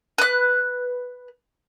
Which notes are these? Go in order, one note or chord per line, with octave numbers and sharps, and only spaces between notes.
B4 F#6